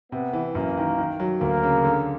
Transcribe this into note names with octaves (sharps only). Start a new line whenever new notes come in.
C3 B3
E3
F#2 A#3
D#3
D#3
F#3
D2 A#3
C#3
D3